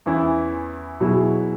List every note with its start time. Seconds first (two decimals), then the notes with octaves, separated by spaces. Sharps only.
0.06 E2 E3 C#4 E4
1.00 B2 F#3 E4 G#4